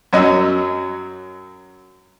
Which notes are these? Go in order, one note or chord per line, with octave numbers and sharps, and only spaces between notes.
F#2 F#3 C#5 D#5 E6